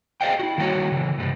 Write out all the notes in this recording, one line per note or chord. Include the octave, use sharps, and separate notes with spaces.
G#4 C5 D5 D#5 F5 G5
E4 F#4
D#3 G3 A#3 F#4 C#5
C#3 E3
G2 C3 G3